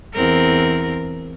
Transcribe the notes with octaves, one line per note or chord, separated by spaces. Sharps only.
E2 C4 A#4